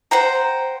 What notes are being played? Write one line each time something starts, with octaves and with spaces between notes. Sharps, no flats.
C5 F#5 G5 A#5